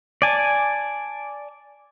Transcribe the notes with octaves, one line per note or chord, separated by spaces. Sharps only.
D5 G#5 A5